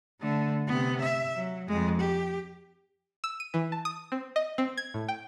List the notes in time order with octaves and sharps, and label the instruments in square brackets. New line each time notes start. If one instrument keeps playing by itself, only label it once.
[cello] D3 A3
C3 B3
E5
F#3
F2 G#3
G4
[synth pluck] E6
D#7
E3
A5
D#6
C4
D#5
C4
G#6
A2
G5